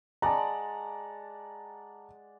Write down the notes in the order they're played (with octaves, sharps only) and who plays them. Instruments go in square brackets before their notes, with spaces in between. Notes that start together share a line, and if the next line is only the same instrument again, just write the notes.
[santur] G#3 D5 F#5 [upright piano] A5 A#5